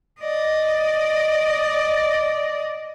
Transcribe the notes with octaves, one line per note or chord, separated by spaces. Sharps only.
D5 D#5